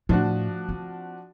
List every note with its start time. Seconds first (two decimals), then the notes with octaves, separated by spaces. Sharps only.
0.09 A2 F3 D4 F#4
0.69 C4